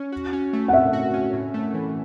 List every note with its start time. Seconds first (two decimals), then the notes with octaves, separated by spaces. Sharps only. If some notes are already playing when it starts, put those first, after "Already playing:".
Already playing: C#4
0.12 F#4
0.33 C#4
0.53 A3
0.68 F#5
0.73 A2 E5
0.93 F#4
1.14 C#4
1.33 A2
1.54 A3
1.74 E3